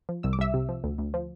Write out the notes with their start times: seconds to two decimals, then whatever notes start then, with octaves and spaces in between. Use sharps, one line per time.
0.09 F3
0.23 C2 E6
0.33 D6
0.39 C2 E5 E6
0.54 C3
0.69 F3
0.84 D2
0.98 D2
1.14 F3